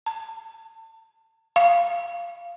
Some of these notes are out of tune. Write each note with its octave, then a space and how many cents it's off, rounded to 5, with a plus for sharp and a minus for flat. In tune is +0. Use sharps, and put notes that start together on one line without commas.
A5 +35
F5 -10